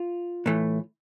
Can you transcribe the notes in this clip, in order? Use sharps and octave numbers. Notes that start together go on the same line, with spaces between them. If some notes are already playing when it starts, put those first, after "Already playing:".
Already playing: F4
A2 E3 A3